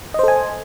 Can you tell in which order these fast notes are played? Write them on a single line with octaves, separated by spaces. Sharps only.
D#5 C5 A4 G#5